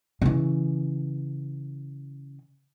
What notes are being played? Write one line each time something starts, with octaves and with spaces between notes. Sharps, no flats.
C#3 E3